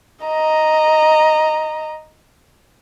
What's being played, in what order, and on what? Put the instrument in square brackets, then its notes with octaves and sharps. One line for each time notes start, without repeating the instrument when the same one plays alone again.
[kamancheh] D#5 A#5